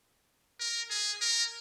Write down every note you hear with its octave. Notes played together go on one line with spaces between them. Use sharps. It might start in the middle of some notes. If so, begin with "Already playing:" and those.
A#4
G#4
A#4